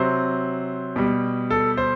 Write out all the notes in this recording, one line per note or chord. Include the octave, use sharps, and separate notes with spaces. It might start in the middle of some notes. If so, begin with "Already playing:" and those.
Already playing: C3 F#3 C5
B2 G3
A4
C5